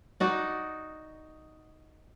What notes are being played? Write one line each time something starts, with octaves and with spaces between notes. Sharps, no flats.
D#4 F#4 D5